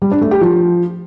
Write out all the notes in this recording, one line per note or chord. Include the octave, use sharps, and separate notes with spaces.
G3
D4
A3
G4
F3